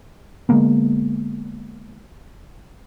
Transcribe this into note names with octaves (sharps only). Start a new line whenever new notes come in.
D3 G#3 A#3 B3